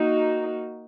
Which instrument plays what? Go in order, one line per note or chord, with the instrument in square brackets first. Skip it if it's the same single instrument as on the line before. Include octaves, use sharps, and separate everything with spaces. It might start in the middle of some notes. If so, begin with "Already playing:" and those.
Already playing: [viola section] A#3 D#4 F#4